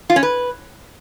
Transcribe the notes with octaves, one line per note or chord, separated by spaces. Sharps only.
F4
C#4
B4